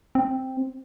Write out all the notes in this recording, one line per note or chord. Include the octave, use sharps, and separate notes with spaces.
C4